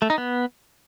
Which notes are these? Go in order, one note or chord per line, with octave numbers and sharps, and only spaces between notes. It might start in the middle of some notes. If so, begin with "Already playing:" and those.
A3
D#4
B3